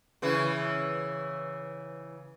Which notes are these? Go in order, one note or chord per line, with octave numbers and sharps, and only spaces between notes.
C#3 E3 E4